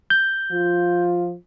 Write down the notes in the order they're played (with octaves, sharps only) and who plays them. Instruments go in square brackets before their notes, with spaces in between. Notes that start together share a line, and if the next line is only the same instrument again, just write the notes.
[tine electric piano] G6
[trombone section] F3 F4